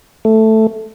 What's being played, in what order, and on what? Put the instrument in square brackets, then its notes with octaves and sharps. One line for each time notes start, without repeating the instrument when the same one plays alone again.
[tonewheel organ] A3